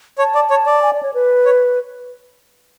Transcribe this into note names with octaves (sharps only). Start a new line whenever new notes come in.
C#5 A5
D5
C#5
D5
G#5
D5
C#5
B4
C#5